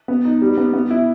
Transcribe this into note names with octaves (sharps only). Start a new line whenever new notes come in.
B3
D#4
G3
B3
B3
E4